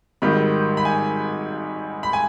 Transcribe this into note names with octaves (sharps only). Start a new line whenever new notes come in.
G#1 G#2 D#3 G3 B5
B5
G#5
B5
G#5